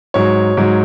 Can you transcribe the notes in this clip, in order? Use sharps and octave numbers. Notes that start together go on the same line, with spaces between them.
G#2 F#3 C#5
G#2 F#3